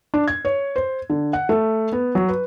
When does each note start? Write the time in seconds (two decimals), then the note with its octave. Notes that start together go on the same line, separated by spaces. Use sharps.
0.14 D4
0.28 G#6
0.45 C#5
0.76 C5
1.10 D3
1.33 F#5
1.49 A3
1.92 B3
2.15 F#3
2.28 B4